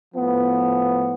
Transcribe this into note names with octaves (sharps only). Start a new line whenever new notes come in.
A2 F3 B3